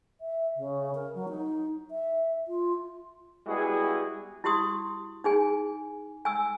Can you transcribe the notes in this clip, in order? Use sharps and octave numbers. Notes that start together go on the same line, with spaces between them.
E5
C#3
A#4
F#3
D#4
E5
F4
G3 G#3 B3 E4 F#4 G#4
E4 F#4 G4 C6 D#6
D#4 G#4 G#5
G#5 E6